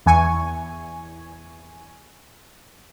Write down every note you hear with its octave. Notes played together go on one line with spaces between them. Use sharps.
E2 E3 G#5 C#6